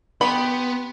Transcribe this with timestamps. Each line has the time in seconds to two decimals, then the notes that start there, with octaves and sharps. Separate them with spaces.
0.21 B3 G4 G5 B5 C6